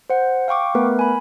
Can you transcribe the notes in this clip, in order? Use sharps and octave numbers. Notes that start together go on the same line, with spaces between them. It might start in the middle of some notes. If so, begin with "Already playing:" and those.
C5 F#5
F5 G5 C#6 D6
A3 B3 A#4 B4
G#5 B5